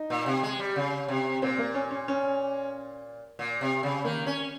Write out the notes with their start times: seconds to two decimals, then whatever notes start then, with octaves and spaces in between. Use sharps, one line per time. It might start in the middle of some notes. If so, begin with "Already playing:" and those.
Already playing: D#4
0.10 A#2
0.26 C3
0.43 G#3
0.59 G3
0.76 C#3
1.08 C3
1.42 A#2 C4
1.58 A#3
1.74 C#4
1.91 C#4
2.08 C#4
3.39 A#2
3.61 C3
3.83 C#3
4.04 D#3 A#3
4.27 C#4